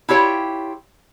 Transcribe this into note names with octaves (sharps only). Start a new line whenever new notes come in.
E4 F4 G4 C#5